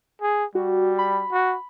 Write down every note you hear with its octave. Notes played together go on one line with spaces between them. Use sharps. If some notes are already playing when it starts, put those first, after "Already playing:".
G#4
G3 F#4
B5
F#4